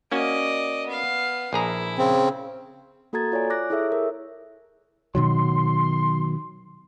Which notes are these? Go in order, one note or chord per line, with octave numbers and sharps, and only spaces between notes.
A#3 C#4 F#4 D5 D#5
B3 F5
A#1 E4 G#4 A#5
C#3 C4
A#3 F#4 A4 A#5 G#6 A6
F4 C#5 D5 G#5
D6 F#6 A#6
E4 G#4 A4 C#5 E5
A#4
B2 D#3 F#3 C6